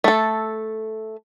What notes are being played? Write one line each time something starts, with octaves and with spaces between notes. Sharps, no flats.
A3 A4